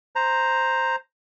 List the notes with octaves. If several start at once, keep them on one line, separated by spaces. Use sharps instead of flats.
C5 A#5